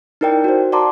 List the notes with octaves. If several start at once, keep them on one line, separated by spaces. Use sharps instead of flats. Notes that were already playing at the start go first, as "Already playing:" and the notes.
D#4 E4 A#4 D5 G5
F#4 C5
D5 F#5 A5 A#5 C6 D6